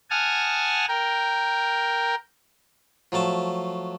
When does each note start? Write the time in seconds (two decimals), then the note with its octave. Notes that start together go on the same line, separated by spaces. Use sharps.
0.10 F#5 G#5 A5 D#6 F6
0.88 A#4 G5
3.12 F3 F#3 A3 A5